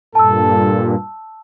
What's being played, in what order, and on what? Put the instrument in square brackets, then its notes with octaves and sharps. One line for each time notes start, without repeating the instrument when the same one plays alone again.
[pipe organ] G2 A#2 [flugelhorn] A4 [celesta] A5 E6